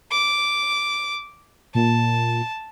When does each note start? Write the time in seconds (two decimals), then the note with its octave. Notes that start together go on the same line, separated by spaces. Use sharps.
0.12 D6
1.75 A#2 A5